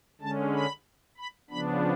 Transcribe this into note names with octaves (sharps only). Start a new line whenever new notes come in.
D3 G#3 C#4 A5
B5
B5
C#3 F3 B3 D4 B5